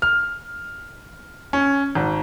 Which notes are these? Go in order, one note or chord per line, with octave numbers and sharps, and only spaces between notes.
F6
C#4
G#1